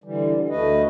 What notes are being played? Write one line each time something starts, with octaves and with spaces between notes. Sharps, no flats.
D3 E3 G3
D2 A3 B4 D#5